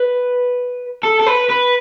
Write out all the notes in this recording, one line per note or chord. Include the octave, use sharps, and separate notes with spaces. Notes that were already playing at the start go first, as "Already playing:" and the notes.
Already playing: B4
A4
A4
B4
B4